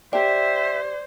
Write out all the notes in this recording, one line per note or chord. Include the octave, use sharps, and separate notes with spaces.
G4 C5 D5 E5 G5